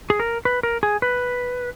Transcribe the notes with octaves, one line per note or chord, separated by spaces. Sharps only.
G#4
A#4
B4
A#4
G#4
B4